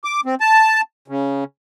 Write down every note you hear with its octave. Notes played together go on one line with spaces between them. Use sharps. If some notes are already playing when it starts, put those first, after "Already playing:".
D6
C4
A5
C#3